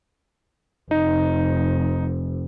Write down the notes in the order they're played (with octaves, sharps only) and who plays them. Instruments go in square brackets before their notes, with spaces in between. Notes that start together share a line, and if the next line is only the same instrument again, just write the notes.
[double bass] F1 [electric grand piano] D#4